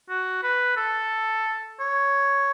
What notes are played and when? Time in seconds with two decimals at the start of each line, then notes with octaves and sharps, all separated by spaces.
0.09 F#4
0.43 B4
0.77 A4
1.80 C#5